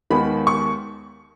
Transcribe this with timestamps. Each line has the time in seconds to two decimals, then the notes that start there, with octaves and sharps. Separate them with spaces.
0.10 D#2 D#3 G#3 B3 B5
0.47 C#6